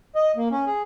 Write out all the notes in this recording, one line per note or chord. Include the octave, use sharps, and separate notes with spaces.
D#5
A#3
C#4
G#4